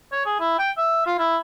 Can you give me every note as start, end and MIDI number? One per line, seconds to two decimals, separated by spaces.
0.12 0.23 73
0.26 0.39 68
0.40 0.58 64
0.59 0.71 79
0.78 1.05 76
1.06 1.14 65
1.19 1.37 64